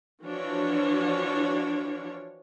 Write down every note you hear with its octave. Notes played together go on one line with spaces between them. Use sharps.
E3 F3 D4 F#4 C#5